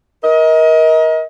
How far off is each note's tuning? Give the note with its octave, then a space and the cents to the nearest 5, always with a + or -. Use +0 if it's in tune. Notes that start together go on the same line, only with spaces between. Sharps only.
A#4 +25 D#5 +30